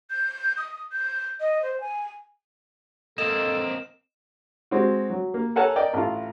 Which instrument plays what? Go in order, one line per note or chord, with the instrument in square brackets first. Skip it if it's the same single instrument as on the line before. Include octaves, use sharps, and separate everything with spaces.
[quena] G6
D#6
G6
D#5
C5
G#5
[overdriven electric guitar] A#3 C4 [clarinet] A4 [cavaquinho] D#5 [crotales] E7
[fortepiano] G#3 C4 F#4
F#3
A#3
A4 A#4 C#5 F#5 G#5 A5
A#4 D5 D#5 G5
A1 F4